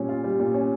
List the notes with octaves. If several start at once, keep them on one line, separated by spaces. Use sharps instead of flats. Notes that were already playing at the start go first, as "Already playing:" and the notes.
Already playing: A#2 G3 C#4
F4
G3
A#2
C#4